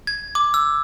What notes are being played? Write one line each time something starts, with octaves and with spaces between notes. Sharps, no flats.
G#6
D6
E6